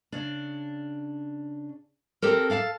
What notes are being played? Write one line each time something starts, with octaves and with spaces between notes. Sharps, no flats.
C#3 D4
C4 G4 A4 A#4
A4 F5 F#5 A5